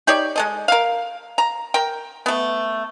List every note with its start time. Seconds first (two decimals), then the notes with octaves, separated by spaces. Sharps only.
0.07 D#4 G4 C#5 D5
0.36 G#3 A4 D#5
0.68 A#4 F5
1.38 A#5
1.74 A#4 G5
2.26 A3 B3